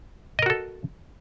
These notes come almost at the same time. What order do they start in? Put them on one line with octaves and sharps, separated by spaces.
D#5 A#4 F#4 A4